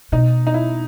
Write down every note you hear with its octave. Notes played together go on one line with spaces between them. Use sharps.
B2 D#4
D#4
E4